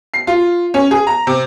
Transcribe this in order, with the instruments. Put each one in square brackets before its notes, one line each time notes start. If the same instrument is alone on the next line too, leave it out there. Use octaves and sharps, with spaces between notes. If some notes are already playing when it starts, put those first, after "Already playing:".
[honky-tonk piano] C7
F4
C#4
G#4
A#5
C3